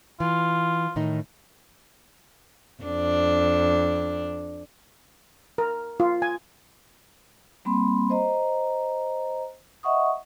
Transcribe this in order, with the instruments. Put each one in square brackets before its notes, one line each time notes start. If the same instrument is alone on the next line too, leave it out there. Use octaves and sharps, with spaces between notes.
[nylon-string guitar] E3 [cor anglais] F4
[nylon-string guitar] A2 D#3 D#4
[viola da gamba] F2 D4
[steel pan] A#4
F4
G#5
[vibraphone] G3 A#3 C4 B5 C6
C5 D#5 A#5
D#5 E5 F#5 C#6 D#6